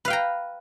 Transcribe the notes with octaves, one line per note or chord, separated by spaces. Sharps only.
B4 F5 G5 A#5